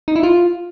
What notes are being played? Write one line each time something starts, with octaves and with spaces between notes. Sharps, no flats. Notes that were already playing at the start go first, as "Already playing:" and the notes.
D#4
E4
F4